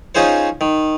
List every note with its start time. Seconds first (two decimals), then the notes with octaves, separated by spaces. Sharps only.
0.15 C#4 D#4 F4 G#4 C5 C#5
0.61 D#3